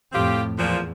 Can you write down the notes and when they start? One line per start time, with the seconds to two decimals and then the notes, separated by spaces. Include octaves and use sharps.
0.12 F2 A2 C4 F4 G4
0.58 E2 A#2 F3